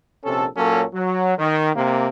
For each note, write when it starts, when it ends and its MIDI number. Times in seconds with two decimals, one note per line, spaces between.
0.24 0.45 34
0.24 0.45 48
0.24 0.45 61
0.24 0.45 69
0.57 0.83 46
0.57 0.83 54
0.57 0.83 58
0.57 0.83 61
0.57 0.83 69
0.94 1.34 54
1.38 1.70 51
1.75 2.08 48
1.75 2.08 58